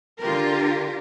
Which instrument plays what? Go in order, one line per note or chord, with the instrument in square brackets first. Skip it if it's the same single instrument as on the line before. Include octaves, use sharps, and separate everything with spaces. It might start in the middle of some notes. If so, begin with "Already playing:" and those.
[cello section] D3 F4 G4 A#4